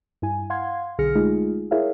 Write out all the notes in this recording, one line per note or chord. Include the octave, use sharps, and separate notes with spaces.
G2 E4 G#5
F5 F#5 C6 G#6
B1 D3 G#4 F6 A#6 C#7
G#3 A3 D#4 F4 G#4
E4 G#4 A#4 C#5 E5 F5